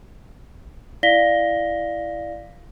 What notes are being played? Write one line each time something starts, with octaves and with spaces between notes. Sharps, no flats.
E4 D5 F5 A#6 B6 G7